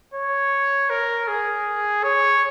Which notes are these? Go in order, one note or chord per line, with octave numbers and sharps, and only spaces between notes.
C#5
A#4
G#4
C#5